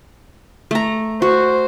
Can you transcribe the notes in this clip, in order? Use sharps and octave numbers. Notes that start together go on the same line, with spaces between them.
A3 A#5
F#4 C5